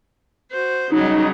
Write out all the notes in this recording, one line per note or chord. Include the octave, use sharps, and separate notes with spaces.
F#4 C5
C#3 F#3 G3 D#4